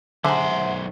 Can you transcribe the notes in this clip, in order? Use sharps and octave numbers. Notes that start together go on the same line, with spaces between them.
B1 D3 G#4 C5 E5 F#5 A#5